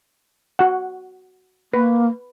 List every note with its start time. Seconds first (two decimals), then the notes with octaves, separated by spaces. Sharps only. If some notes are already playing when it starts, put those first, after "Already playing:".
0.59 F#4 F#5
1.74 A#3 B4